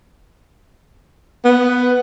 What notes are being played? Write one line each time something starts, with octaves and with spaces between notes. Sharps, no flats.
B3